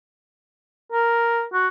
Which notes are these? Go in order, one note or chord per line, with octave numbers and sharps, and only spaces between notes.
A#4
F#4